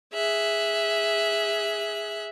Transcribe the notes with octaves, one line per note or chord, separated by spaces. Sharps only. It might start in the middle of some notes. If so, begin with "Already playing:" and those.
G#4 E5 F#6